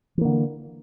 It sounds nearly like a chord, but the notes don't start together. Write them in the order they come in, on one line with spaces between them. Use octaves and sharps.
E3 A#3 D3